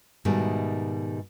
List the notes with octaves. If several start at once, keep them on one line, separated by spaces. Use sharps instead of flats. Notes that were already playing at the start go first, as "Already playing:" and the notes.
G#2 B2 D#3 G3 A3